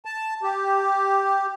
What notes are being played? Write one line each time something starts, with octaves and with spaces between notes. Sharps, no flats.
A5
G4